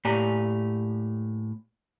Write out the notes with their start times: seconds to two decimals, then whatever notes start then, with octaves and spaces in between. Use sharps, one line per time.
0.05 A2 A#3 G4 D5 G#5 A#5